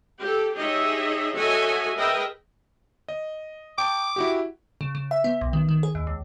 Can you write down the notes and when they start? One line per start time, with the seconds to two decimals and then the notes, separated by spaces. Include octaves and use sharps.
0.20 G4 A4
0.54 D#4 G4 G#4 C#5 D#5 E5
1.33 F#4 A4 C#5 D#5 E5 G#5
1.96 G#4 A#4 B4 D#5 E5 G5
3.08 D#5
3.78 G5 A5 D6
4.16 E4 F#4 G4
4.81 C#3
4.95 C#3
5.11 E5
5.24 B3
5.41 B1
5.53 D#3
5.69 D#3
5.83 G#4
5.95 D#2
6.07 C#2